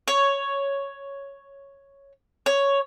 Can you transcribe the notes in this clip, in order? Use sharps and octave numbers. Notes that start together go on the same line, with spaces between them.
C#5
C#5